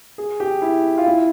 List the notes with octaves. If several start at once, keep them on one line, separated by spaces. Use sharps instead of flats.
G#4
G4
E4
F4
E4